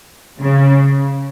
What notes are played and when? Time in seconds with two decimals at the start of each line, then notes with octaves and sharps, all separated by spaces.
0.41 C#3